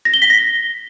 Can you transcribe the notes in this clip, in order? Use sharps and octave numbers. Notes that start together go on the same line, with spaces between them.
A#6
G7
B6
A#6